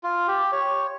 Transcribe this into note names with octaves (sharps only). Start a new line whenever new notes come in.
F4
G4
C#5